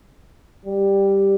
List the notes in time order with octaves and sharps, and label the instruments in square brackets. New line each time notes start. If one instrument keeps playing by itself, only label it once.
[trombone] G3